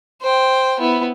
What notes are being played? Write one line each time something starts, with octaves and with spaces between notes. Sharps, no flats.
C5 G5
B3 E4